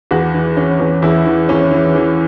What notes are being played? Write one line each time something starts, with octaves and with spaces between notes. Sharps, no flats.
E2 F#4
E3
E3 C#4
E2
E2 E4
E3
E2 C#4
E3
E3